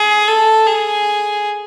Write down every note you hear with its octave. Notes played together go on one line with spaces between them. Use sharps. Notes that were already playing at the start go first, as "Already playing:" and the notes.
Already playing: G#4
A4
G#4